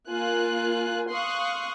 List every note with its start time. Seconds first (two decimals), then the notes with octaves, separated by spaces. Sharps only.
0.10 A#3 F4 G#5 F#6
1.12 F5 C6 C#6 D#6 F#6